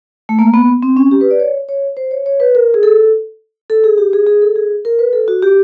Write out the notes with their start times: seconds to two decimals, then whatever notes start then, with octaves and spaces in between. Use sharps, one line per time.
0.29 A3
0.39 A#3
0.54 B3
0.83 C4
0.97 C#4
1.11 G4
1.21 B4
1.31 D5
1.40 C#5
1.69 C#5
1.97 C5
2.11 C#5
2.26 C#5
2.40 B4
2.55 A#4
2.74 G#4
2.83 A4
3.70 A4
3.84 G#4
3.98 G4
4.13 G#4
4.27 G#4
4.42 A4
4.56 G#4
4.85 A#4
4.99 B4
5.13 A4
5.28 F#4
5.42 G4